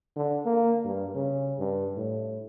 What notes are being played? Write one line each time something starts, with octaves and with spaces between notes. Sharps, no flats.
D3
A#3
G2
C#3
G2
A2